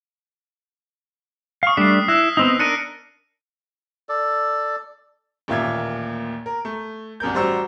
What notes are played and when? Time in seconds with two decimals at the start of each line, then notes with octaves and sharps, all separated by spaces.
1.63 F5 C#6 D#6 F6
1.77 G3 A3 D4 B6 C7
2.08 E4 E6 F#6 A#6
2.37 B3 C4 D#4
2.59 D4 A#4 F#6 C#7 D#7
4.09 A4 D5
5.48 A1 D#2 A#2 F4 E5 G#6
6.46 A#4
6.65 A3
7.20 C2 F#2 A#4 G6
7.34 A1 G3 F#4 C5 A#5 E6